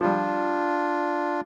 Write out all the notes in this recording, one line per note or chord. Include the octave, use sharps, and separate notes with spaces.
F3 G3 D4 F4